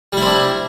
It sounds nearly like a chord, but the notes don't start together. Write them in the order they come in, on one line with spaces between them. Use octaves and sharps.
G3 E4 C4 D4